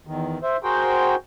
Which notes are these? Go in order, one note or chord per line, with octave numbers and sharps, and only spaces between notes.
E2 D#3
C5 E5
F#4 G#4 A#4 C5 G5